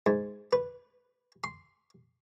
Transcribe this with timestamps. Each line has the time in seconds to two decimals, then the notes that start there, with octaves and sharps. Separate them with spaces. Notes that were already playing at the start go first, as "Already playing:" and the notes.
0.06 G#2
0.53 B4
1.44 C6